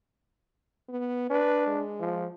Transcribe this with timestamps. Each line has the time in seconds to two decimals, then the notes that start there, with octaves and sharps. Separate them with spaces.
0.89 B3
1.30 D4 B4
1.67 G#3
2.00 F3